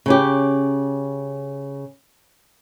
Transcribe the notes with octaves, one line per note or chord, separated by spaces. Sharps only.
C#3 C#4 G4